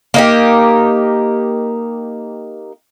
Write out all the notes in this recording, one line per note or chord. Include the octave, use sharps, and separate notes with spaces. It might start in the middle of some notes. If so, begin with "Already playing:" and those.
A#3 D#4 G4